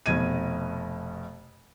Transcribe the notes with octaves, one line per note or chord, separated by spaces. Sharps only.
F1 B2 G#6 D#7